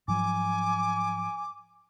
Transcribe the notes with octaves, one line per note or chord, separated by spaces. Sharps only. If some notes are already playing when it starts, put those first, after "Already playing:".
G#2 F3 F#3 G#5 D6